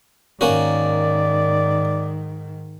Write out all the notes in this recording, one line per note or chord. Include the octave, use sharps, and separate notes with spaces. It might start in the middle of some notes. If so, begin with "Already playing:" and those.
G#2 D#3 A#3 C#4 F#4 D5